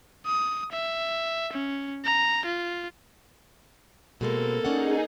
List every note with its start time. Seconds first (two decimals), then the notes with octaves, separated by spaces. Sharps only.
0.26 D#6
0.72 E5
1.53 C#4
2.05 A#5
2.45 F4
4.21 B2 G#3 A#3 C4 A4
4.65 C#4 D#4 G#4 D5 F#5